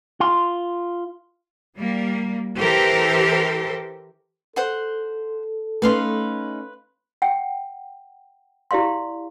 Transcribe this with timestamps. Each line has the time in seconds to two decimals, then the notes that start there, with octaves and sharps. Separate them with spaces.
0.20 F4
1.77 G3 A#3
2.58 E3 G4 A4 A#4 C5
4.56 A4 C5 F#5 C6
5.82 A3 C#4 D#4 B4 F5 C6
7.22 F#5 G5
8.71 E4 G4 D5 F5 C6